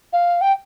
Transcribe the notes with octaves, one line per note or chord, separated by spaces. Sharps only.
F5
G5